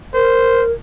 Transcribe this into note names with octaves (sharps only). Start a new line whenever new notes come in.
A#4 C5